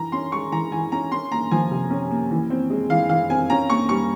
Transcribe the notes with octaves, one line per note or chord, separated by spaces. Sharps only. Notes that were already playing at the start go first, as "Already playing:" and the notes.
Already playing: E3 A#5
C#4 C6
G#3 C#6
E3 A#5
E3 G#5
C#4 A#5
C#4 C6
A#3 A#5
F3 G#5
C3
C#4
A#3
E3
C4
G#3
E3 F5
E3 F5
C4 G#5
C#4 A#5
A#3 C#6
G3 C#6